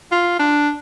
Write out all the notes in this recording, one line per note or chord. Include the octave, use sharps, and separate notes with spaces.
F4
D4